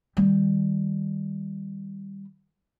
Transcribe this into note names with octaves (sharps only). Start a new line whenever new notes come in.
D#3 G3